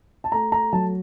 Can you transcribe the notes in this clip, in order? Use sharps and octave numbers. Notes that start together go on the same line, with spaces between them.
A5
A3 A#5
A#5
F#3 A5